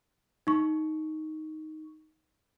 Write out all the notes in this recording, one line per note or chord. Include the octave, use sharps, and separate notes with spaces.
D#4 C#6